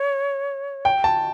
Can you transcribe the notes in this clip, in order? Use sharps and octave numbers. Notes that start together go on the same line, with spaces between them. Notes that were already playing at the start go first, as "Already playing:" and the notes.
Already playing: C#5
G5
A5